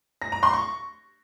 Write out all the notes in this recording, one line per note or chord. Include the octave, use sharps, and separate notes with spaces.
A#6
A#5
C6
C#6